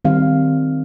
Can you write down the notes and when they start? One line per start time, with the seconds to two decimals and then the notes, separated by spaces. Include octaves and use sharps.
0.05 D#3 G3 C4 F5